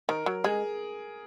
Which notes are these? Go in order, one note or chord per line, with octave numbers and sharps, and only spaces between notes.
D#3 A#4
F#3
G#3 G#4